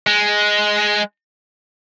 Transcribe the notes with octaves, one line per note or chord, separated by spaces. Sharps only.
G#3